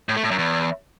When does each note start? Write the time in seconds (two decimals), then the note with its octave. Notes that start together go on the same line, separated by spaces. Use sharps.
0.09 A2
0.16 A3
0.24 A2
0.31 F#2
0.39 E2